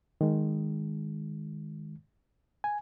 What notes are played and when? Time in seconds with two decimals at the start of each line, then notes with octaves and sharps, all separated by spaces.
0.21 D#3 G#3
2.64 G#5